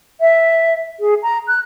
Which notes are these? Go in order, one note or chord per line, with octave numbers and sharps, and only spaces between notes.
E5
G#4
A#5
F#6